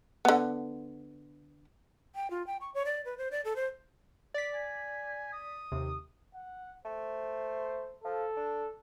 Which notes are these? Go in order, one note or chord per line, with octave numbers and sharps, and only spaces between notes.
D3 B3
G5
F4
G5
C#6
C#5
D5
B4
C5
D5
A4
C5
D5 B6
G#5
D#6
D#2 C3
F#5
A3 C5
F3 A4
D4